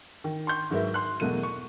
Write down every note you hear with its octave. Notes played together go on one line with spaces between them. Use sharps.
D#3
C6 C#6 G6
G#2 F#3 F#4 A#4 B4 E5
C6 F#6
E2 B2 F#3 A3 A#3 D#7
C#6